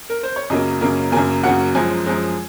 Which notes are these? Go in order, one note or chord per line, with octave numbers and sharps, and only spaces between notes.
A#4
C5
C#5
F#2 C#3 F#3 A#3 D#5
F#2 C#3 F#3 A#3
F#2 C#3 F#3 A#3 G#5
F#2 C#3 F#3 A#3 F#5
F#2 F3 G#3 G#5
F#2 F3 G#3